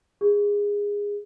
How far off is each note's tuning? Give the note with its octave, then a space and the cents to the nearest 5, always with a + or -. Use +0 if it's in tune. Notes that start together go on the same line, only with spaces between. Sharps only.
G#4 -20